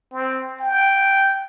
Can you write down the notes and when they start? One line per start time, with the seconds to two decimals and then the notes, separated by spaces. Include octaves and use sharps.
0.13 C4
0.60 G5